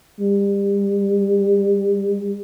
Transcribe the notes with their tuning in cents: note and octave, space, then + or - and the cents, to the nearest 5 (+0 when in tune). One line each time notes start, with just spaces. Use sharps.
G3 +30